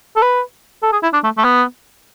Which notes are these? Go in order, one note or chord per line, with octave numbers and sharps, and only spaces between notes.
A4
B4
A4
G#4
E4
D4
A3
A3
B3